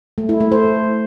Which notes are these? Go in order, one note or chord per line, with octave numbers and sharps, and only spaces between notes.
A3
E4
A3
C5